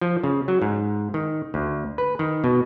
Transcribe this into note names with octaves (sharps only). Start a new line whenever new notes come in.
F3
C#3
F#3
G#2
D#3
D2
B4
D#3
B2